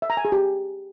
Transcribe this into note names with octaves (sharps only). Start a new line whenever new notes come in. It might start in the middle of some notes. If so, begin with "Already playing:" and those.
E5
A#5
G#5
G#4
G4